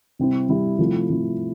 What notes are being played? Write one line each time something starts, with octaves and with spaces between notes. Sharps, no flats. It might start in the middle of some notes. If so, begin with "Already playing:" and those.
C3 G3 C4 E4
C3 G3 C4 E4
C3 F3 A3 E4
C3 F3 A3 E4